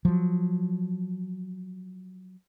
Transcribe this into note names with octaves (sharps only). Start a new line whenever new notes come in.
F3 F#3